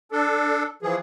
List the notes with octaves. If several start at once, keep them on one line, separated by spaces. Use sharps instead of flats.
D4 A4
E3 F3 G#4